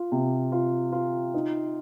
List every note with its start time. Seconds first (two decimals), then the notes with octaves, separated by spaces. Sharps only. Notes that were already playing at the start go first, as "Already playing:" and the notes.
Already playing: F4
0.12 C3
0.52 F4
0.92 F4
1.34 D#4